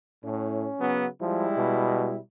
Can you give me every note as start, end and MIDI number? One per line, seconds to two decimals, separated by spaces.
0.25 0.67 45
0.25 1.04 61
0.80 1.07 49
0.80 1.07 54
0.80 1.07 59
1.21 1.47 53
1.21 2.17 55
1.21 2.17 56
1.21 2.17 64
1.58 2.19 47